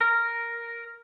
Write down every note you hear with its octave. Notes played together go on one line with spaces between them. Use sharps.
A#4